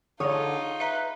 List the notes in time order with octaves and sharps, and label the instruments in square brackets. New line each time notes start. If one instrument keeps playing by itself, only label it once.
[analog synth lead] D3 [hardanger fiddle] D#4 F4 [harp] G#4 C#5 D#6
[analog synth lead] B4 [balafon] E5 A#5